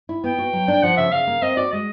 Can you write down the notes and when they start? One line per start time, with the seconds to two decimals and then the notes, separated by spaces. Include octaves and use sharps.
0.09 E4
0.23 B3 G5
0.38 F#4
0.53 F#3
0.68 D4
0.83 F3 F#5
0.97 C#3 E5
1.12 C#3 F5
1.27 A#3
1.42 C4 D#5
1.57 F#4 D5
1.72 G#3 D#5